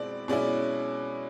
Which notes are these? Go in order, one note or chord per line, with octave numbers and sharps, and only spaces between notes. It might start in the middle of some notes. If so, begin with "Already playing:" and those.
Already playing: B2 G#3 C4 E4 D5
B2 G#3 C#4 E4 D5